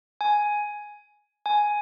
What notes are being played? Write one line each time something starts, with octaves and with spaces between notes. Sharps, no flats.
G#5
G#5